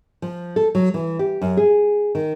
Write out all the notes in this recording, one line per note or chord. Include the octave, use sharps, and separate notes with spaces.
F3
A4
F#3
E3
G4
F#2
G#4
D#3